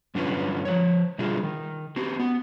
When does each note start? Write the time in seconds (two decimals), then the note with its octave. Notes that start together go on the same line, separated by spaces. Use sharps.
0.15 G2 D3 F#3 C#4 F4 B4
0.65 F3 C#5
1.19 B2 D3 G3 A3 F4 G#4
1.43 D#3
1.96 C4 F#4 G4
2.19 B3